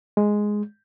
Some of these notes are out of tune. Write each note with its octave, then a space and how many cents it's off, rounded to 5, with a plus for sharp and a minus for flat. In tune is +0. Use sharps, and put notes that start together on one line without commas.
G#3 +0